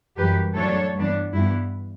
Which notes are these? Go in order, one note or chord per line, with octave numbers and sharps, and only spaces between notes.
F#2 E3 G3 G4 B4
A2 F#3 A3 D4 A4 C#5
G2 E3 B3 D4
G2 E3 B3 E4